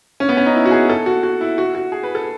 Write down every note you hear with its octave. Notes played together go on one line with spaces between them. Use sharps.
C#4
B3
C#4
D#4
E4
F#4
G#4
A4
F#4
F#4
E4
F#4
F#4
G#4
B4
A4